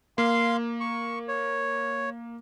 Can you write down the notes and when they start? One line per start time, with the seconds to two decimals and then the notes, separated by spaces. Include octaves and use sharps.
0.18 A#3 F5 C6
0.80 C#6
1.28 C#5